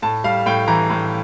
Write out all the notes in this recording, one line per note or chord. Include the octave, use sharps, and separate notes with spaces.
A2 A5
G3 F5
A2 G5
E3 A#5
A2